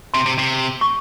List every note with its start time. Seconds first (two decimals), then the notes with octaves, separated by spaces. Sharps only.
0.14 C3 C6
0.26 C3
0.39 C3
0.81 C#6